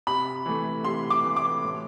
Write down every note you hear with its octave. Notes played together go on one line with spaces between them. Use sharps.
C3 B5
E3 A3
C3 C6
D6
E3 A3
D6
A2